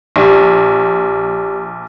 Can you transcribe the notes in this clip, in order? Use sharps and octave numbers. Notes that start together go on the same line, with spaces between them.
A#1 G4 D5